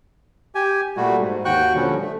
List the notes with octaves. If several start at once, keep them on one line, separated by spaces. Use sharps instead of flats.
G4 G#5
A#2 G3 A3 F#4
G#2
D#2 F#4 G5 C#6 F#6
A#2 D3 F3 G3 C#4
A3